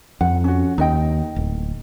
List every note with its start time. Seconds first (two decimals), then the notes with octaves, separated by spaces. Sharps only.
0.21 F2 F#5
0.44 C#4 F#4
0.78 D#2 D#4 D#5 G5
1.36 D1